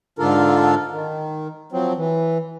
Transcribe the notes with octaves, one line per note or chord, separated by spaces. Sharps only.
G#2 D3 D4 F4 A4 A#4
D#3
F3 F#3 C4
E3